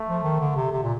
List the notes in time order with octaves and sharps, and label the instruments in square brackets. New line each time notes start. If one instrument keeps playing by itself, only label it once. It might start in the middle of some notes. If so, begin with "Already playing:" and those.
Already playing: [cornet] A3
[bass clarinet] F3
D#3
D3
C3
C3
A#2